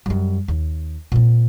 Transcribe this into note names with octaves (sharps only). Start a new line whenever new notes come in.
F#2 G3
D#2
A#2 C4